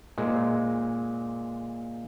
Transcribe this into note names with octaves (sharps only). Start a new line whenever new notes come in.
A#2 G#3